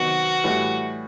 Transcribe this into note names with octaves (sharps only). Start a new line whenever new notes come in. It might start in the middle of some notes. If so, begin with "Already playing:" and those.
Already playing: C3 D#3 F#3 B3 F#4
A2 E3 G3